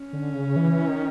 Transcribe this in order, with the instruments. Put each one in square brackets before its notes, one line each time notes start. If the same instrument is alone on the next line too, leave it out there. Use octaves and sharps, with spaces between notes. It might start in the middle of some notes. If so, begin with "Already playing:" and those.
Already playing: [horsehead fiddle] C#4
[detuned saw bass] D3
C#3
E3
D#3